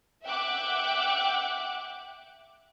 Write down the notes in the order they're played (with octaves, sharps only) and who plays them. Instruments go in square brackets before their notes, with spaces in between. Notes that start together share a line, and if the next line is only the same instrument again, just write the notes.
[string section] E5 F#5 G5 D6 F#6